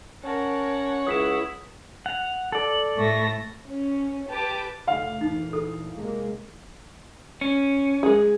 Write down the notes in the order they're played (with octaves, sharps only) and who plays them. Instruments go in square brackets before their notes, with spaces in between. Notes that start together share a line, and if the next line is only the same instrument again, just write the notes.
[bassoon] C#4 [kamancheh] A#4 A5 [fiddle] C#5 F#5
[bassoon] C#2 [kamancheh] E4 [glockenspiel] D#6 B6 E7
[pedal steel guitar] F#5 [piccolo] F7
[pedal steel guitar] A4 D5 [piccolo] F#7
[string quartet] A2 A3 A#6 [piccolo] C#6
[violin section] C#4
G4 B4 A5 D6
[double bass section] F1 D3 A3 [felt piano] F5
[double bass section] D2 A#2 E3 [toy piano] D#4
[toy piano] A4
[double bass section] C3 G#3 A#3
[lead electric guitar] C#4
[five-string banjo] G#3 G#4